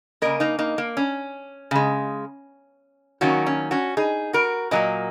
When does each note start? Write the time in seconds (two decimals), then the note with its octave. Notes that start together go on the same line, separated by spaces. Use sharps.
0.22 C#3 A#3 A#4 D#5
0.40 A#3 D#4
0.59 A#3 D#4
0.78 A#3
0.97 C#4
1.71 C#3 G#3
3.21 D#3 F#3 A#3 C#4 F#4
3.46 C#4
3.71 C#4 F#4
3.97 D#4 G#4
4.33 F#4 A#4
4.71 A#2 F#3 A#3 A#4 D#5